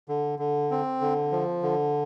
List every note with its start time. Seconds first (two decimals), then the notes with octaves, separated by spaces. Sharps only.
0.09 D3
0.39 D3
0.71 C4
1.01 D3
1.32 F3
1.63 D3